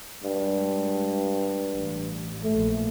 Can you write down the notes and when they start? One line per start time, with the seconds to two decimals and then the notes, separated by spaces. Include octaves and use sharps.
0.24 G2 G#3
1.69 A1
2.44 A#1 A2 A3